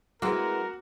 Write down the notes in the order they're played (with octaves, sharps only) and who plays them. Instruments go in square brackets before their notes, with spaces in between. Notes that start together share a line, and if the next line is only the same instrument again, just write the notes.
[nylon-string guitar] G#3 E4 B4 [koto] A#3 C4 [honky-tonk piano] F#4 [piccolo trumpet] A#4